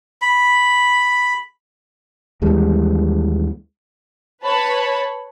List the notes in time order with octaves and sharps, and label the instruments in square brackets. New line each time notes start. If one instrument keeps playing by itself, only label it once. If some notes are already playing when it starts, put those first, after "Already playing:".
[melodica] B5
[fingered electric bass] D#2 E3 G3 G#3
[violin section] B4 C#5 A5 B5